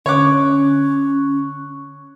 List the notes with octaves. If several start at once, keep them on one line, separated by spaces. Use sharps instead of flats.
D3 C#4 C#5 C#6 D6 F#6